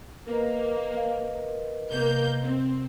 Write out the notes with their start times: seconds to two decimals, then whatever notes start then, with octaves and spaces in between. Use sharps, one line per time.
0.27 A#3 A#4 B4 D#5
0.96 F5
1.90 C3 A#3 G6
2.42 C4